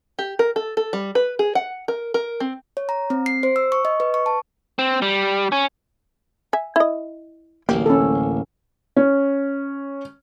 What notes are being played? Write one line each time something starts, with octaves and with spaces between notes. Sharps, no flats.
G4
A#4
A4
A4
G3
B4
G#4
F#5
A#4
A#4
C4
C#5
A#5
C4
C7
C5
E6
C#6
D#5
B4
C#6
A5
C4
G3
C#4
E5 G#5
E4 D#5
D1 A1 A#3 G4
C#4 A4
C#4